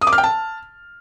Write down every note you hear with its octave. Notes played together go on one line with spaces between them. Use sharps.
D#6
D6
F6
G5
A5